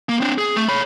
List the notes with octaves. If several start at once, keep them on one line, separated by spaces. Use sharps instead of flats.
A#3
C4 D4
G#4
A3
C#5 B5